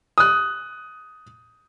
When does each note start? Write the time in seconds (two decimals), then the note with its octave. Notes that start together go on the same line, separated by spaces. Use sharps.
0.18 D#6 F#6